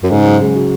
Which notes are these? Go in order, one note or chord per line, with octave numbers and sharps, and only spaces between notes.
F#2
G#2 C#3
F#3
C#3
F#4